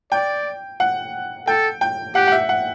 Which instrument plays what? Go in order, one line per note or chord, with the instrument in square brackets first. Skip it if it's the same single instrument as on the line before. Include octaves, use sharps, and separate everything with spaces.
[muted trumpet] D5 [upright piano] G5
[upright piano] F#5
[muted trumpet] A4 [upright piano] G5
[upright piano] G5
[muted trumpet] G4 [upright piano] F#5
[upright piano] F#5
E5
F#5